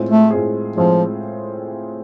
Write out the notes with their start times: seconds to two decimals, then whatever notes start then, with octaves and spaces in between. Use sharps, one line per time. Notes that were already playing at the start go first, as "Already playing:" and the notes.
Already playing: A2 G#3 C4 F4 G#4
0.09 A3
0.31 A2 G#3 C4 F4 G#4
0.76 A2 F3 G#3 C4 F4 G#4